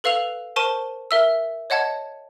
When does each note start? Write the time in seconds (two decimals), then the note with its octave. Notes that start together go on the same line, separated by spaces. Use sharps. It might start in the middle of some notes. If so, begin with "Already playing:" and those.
0.04 A4 B4 F5 E6 F7
0.56 A#4 C5 A5 C#6 D#7 G7
1.11 A#4 E5 E6
1.70 C#5 D#5 F#5 A5 G#6